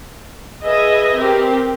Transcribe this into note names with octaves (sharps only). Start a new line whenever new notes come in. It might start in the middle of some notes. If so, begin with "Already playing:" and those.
G#4 B4 D#5 E5
C4 G4 A#4